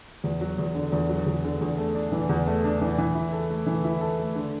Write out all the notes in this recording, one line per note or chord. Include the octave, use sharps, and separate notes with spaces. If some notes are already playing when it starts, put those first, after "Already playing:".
E2
F#3
E2
D3
E2
F#3
E2
D3
E2
A3
D4
E3
E2
A3
D4
E3
E3
E4
A4
A3
E3
E4
A4
A3
D3